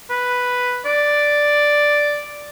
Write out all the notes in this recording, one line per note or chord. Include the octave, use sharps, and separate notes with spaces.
B4
D5